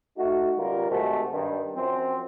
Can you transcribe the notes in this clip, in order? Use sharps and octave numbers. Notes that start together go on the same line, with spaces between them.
A3 D#4 F#4
C#2 G3 F4 A#4
G#2 C3 D#3 A3 F#4
G2 D#3
F#2 F3 C4